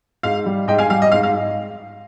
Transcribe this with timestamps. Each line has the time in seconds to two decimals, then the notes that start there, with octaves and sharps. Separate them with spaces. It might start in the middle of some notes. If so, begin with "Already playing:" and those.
0.23 G#2 F5
0.46 G3
0.68 G#2 D#5 G5
0.78 F5 G#5
0.90 G3 F5
1.02 D#5
1.12 G#2 F5
1.23 F5